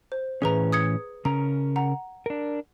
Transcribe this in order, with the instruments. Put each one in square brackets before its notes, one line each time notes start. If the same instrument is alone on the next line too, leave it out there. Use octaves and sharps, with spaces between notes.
[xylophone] C5
[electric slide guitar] A2 E3 C#4 [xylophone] G#4 B4 A#5
[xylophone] D#6 G#6 C#7
[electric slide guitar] C#3 C#4 A#4 [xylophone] A#5
[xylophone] F#5 A#5
[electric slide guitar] D4 A#4